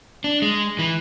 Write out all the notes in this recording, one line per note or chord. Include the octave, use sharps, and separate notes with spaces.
D4
G#3
E3